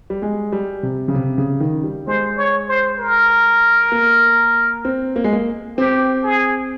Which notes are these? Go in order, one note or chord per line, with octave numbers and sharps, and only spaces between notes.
G3
G#3
G3
C3
C#3
C3
C#3
D#3
G3
G#3 C5
C#5
C5
A#4
A#3
C4
A#3
G#3
A#3
C4 G4
G#4